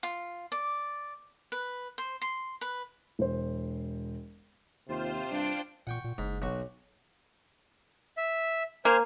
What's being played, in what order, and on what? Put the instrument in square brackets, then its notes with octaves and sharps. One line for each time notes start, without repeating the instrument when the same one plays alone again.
[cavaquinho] F4
D5
B4
C5
C6
B4
[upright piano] E1 C5
[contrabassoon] D#2 [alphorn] C3 [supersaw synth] F4 C5
[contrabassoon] G2 [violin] D4 G5
[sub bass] A#2 [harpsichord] F#5 G5 C#6
[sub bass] A#2
[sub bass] F#1 [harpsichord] G#2
[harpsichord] B1 F#4
[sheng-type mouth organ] E5
[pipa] A#3 [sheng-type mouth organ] C5 G#5 F6